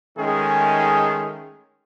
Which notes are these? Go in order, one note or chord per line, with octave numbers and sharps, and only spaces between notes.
D#3 G#3 A3 C#4 G#4